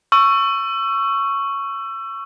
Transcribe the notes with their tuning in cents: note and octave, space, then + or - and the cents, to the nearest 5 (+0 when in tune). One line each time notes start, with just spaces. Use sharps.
C#6 +0 E6 +30